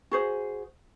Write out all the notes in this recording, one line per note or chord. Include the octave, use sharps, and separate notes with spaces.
F#4 G#4 C5